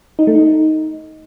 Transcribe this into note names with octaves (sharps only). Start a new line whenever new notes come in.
D#4
A3
D#4